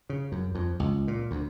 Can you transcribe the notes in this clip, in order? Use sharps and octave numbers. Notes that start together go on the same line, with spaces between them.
C#3
F#2
F2
C#2
A#2
D2